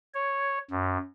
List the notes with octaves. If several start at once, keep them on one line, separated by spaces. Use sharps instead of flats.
C#5
F#2